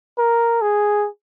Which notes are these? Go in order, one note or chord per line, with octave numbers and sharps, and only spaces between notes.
A#4
G#4